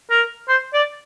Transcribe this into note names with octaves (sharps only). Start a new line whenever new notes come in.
A#4
C5
D5